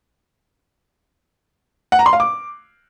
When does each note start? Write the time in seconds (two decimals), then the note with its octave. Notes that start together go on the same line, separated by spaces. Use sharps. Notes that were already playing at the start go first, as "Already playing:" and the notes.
1.92 F#5
1.99 A#5
2.06 C6
2.13 F5
2.20 D6